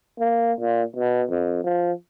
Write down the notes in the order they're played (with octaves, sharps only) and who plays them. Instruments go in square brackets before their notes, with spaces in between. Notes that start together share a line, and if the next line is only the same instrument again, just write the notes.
[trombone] A#3
A#2
B2
F2
F3